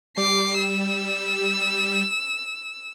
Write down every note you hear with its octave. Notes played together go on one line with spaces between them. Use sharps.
G3 D6 C7
E6